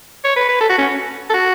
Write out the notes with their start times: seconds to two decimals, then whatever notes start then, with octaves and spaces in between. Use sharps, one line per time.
0.24 C#5
0.36 B4
0.49 B4
0.61 A4
0.69 F#4
0.78 C#4
1.30 A4
1.34 F#4